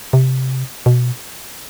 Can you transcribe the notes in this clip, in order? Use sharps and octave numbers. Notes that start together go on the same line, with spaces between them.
C3
B2